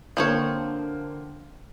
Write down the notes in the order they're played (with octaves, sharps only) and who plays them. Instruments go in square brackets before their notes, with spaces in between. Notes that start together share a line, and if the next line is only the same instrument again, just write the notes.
[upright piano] D3 A#3 [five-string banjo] F3 C4 C#5